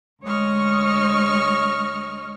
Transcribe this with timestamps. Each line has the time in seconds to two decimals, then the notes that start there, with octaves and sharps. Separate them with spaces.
0.22 D2 G#3 C#5 D#5 C#6 F6